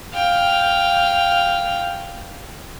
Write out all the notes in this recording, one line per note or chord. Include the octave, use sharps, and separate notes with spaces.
F5 G5